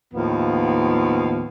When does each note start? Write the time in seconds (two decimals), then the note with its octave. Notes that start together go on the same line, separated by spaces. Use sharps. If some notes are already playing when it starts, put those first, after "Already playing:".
0.12 D#2 A2 F3 B3